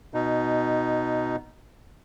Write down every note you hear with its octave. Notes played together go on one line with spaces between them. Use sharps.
B2 D#4